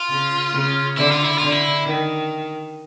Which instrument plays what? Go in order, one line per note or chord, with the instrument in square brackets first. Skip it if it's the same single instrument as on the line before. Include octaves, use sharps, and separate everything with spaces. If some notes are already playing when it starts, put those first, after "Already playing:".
Already playing: [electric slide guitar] F4
[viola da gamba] C#3
C#3
[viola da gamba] D3 [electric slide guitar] E4
[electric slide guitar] F4
E4
[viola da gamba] D3 [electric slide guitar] F4
[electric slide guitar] E4
[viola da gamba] D#3